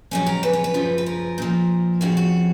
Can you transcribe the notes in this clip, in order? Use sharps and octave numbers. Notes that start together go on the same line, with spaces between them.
F2 C#3 F#3 C#4
A#4
B4
C#5
B4
F#2 C#3 F3
B4
A#4
A#2 F3
F2 C#3 F3 F#4
F#4